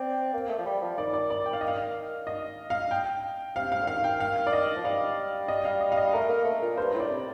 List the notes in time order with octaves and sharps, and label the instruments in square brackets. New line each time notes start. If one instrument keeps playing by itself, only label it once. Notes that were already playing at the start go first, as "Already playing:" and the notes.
Already playing: [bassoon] C4 [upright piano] D5
[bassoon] A#3
A3
F3
G3
F3
[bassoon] D#3 [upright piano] D5
[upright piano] D5
D5
G5
F5
D#5
F5
D#5
F5
G5
[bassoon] C3 [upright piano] F5
[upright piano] F5
[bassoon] D3
[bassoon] D#3 [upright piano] F5
[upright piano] G5
F5
D5
D#5
[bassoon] F3
[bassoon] G3 [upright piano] F5
[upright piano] D#5
F5
D#5
F5
D#5
[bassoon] A3 [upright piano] A#4
[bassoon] A#3
A3
A#2
[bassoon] G2 [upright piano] C5
[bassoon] A2
[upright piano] D5
[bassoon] C3